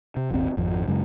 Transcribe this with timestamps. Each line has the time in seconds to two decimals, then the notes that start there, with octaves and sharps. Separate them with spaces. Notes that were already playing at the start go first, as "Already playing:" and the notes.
0.17 C3
0.30 D#1 G#1 D#2 C4
0.57 G#1 F2
0.88 F#2 C#3 G#3